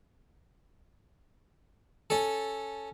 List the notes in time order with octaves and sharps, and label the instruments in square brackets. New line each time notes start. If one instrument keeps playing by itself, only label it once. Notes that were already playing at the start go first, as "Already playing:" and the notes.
[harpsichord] C#4 A4